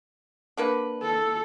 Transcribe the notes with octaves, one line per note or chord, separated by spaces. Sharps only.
D3 A#3 B4
A4